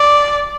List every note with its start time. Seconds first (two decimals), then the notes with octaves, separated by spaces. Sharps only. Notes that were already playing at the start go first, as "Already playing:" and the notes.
Already playing: D5